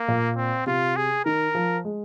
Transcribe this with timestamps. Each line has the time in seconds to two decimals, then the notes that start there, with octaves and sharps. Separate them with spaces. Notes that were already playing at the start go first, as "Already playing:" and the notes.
Already playing: A#3
0.08 A#2
0.37 C4
0.66 C3 F4
0.96 G#4
1.25 D#3 A#4
1.55 F3
1.85 G#3